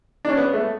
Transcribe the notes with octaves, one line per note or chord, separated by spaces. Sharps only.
D4
C#4
B3
A3